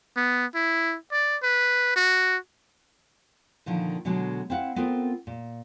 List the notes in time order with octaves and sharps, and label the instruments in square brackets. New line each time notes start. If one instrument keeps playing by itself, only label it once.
[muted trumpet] B3
E4
D5
B4
F#4
[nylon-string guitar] A#2 D3 D#3 F3
B2 D3 F#3 G#3
C4 E4 F5 F#5
B3 C4 F4 A4 A#4 C5
A#2